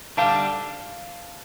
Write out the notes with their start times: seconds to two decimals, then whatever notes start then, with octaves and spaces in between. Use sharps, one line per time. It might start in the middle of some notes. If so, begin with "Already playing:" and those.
0.17 D3 G3 D4 G4 F5 A5